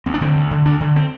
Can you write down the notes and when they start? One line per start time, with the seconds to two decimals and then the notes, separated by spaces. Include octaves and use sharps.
0.06 D2 C4
0.14 D4
0.21 D3 C4
0.36 D2
0.51 D3
0.66 D2 D4
0.80 D3
0.96 C4